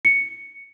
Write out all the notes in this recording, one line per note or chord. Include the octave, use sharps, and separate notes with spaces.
C#7